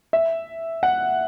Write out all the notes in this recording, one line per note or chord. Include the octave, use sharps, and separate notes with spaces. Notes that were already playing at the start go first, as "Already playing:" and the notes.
E5
F#5